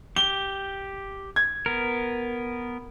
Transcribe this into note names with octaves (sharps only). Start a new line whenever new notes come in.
G4 G7
G#6
B3 A#4